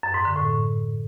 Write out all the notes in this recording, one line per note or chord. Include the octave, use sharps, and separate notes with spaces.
F#2
G#2
D3
A2